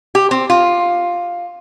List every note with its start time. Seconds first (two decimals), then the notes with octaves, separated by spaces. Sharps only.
0.15 G4
0.31 C4
0.50 F4